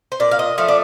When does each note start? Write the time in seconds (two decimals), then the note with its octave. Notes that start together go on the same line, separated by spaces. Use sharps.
0.12 C5
0.20 A#2 D5
0.31 F5
0.39 D#5
0.58 F3 A3 F5
0.68 D5